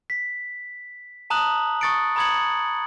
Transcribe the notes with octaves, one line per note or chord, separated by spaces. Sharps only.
B6
A5 A#5 D#6 F#6 F#7
C#6 D#6 A6 C#7 D7
A#5 B5 D#6 G#6 C#7 F#7